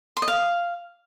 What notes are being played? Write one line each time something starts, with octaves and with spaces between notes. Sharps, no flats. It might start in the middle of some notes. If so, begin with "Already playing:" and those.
C6
D#5
F5